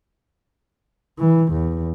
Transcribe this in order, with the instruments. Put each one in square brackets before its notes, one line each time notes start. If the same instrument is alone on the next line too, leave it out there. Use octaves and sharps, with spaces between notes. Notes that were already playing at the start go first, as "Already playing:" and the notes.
[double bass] E3
E2